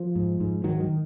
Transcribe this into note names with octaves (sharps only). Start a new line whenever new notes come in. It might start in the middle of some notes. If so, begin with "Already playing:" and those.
Already playing: F3
G#2
G#2
G#2 D#3 F#3
D#3